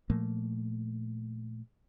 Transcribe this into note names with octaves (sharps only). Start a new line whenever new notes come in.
A#2 F3 A3 A#3